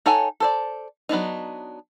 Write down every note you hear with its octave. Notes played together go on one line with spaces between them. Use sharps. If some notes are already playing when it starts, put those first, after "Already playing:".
D#4 A4 C#5 F#5 G#5
A4 C5 D5
F#3 B3 D4 D#4